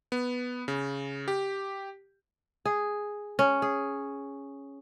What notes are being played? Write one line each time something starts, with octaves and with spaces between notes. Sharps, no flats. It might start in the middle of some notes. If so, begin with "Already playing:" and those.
B3
C#3
G4
G#4
C#4
G#4